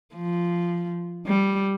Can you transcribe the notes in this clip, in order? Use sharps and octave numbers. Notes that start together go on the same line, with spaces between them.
F3
G3